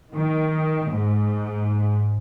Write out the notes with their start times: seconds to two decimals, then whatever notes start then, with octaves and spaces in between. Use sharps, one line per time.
0.14 D#3
0.89 G#2